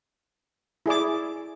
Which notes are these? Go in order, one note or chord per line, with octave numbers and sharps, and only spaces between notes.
E4 G#4 D5 D6